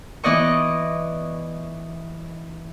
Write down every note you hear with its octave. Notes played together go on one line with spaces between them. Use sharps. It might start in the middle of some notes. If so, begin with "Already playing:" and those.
E3 B3 D5 D#5 C#6